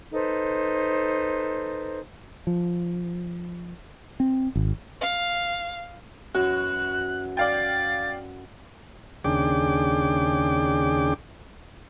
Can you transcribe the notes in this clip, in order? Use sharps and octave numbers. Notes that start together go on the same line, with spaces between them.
D#4 A4 B4 C5
F3
C4
G#1
F5
F#2 E3 F#4 F#6
D5 F5 G5 A6
D#2 C#3 D4 G#4 G5 D6